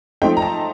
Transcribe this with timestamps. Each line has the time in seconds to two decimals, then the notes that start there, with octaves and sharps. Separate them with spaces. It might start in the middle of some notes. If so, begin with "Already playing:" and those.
0.22 F3 A3 C4 D#4 G5
0.37 A#5
0.42 A5